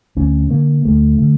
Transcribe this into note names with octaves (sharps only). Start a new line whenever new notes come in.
D2 C#4
D3 A#3
D2 A3
D3